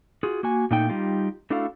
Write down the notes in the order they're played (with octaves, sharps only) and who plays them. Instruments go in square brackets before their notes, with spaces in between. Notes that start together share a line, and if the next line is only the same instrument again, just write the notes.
[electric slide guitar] F4 F#4 G#4
A#3 F#4 G#5
A#2 A3 D#4 G5
G3 D#4 F4 G4
A3 D4 E4 F#4 A4 F5